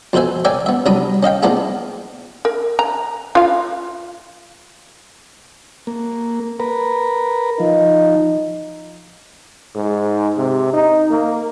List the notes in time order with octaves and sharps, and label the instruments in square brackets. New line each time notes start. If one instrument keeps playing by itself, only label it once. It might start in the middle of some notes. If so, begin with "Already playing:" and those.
[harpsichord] F2 B2 B4 C5 E5 G#5
A#4 C#5 D5 E5 G5 G#5
B3 E5
C2 F#3 D4 A#5 B5 D#6
C#4 D#5 F5 G5
A#3 B3 D4 E4 F4 G#4
[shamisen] A#4
A#5
F4 F5
[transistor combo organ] A#3
A#4 B4
[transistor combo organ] F3 [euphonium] D#4
[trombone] G#2
C3
D#4
A#3